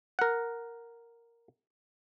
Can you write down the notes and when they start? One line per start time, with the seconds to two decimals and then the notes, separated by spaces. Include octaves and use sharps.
0.19 A#4 F#5